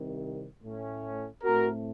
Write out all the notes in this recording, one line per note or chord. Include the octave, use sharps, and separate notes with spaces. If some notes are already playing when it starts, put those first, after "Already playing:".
Already playing: C2 C3 D#3
A2 A3 C#4
A2 A3 C4 F#4 A#4